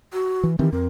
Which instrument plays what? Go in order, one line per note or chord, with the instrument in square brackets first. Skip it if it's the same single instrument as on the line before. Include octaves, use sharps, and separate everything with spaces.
[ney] F#4
[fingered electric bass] E3
[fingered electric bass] D#3 E3 C4 [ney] G4
[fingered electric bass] F2 C4 [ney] A#4